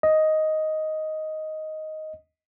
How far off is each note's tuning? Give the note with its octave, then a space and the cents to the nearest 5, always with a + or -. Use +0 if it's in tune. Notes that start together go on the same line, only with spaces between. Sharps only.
D#5 +5